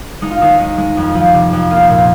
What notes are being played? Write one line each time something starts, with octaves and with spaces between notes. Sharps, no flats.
G#3 D#4
F4
D#2 D#4
G#3
G#3
F2
F3
C3
F2
A#3 F4
A#2